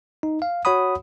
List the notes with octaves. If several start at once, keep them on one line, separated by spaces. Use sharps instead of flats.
D#4
F5
F#4 C#5 F#5 B5 D#6